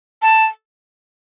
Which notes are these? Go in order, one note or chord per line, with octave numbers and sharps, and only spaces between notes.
A5